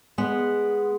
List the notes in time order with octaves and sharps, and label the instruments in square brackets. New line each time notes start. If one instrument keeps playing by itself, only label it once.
[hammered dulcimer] G#3 [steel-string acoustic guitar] B3